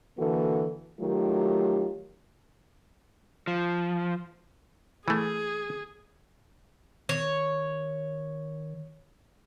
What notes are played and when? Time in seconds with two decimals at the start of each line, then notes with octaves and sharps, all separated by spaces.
0.18 D3 E3 A#3 F#4 A4
1.00 D#3 F#3 A3 F4 G4
3.47 F3
5.08 E3 A3 G#4
7.09 D#3 C#5